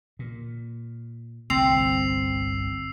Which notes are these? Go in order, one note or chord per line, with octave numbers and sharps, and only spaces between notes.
A#2
G1 C2 G2 C4 E6 C7 F7